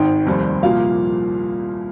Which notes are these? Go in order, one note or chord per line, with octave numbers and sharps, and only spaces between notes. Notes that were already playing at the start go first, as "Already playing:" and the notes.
Already playing: G#1 G#2 D#3 G5
F1 D#2 D#3 G3 C4
C2 A#2 F3 A#3 F5